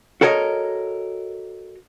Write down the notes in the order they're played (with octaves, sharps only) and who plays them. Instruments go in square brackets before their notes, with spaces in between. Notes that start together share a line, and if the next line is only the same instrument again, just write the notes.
[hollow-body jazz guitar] F#4 A4 A#4 C#5 D#5